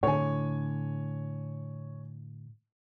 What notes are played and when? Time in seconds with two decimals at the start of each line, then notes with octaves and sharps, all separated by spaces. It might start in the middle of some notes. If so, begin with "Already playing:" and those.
0.03 A2 D3 C#5 G#5